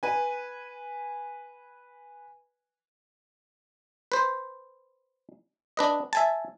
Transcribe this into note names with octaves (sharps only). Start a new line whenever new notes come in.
B4 G#5
B4 C5
D4 B4 D#5
E5 G#5 A5